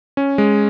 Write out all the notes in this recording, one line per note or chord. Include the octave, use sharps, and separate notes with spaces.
C#4
G#3